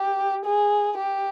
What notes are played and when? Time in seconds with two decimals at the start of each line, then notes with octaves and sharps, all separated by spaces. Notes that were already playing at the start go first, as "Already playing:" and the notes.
Already playing: G4
0.45 G#4
0.97 G4